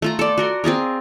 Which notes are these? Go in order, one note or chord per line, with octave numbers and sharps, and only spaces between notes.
A3 F4 A#5
A4 D5
F#4 A#4 C6
C4 F4 G#4 A#4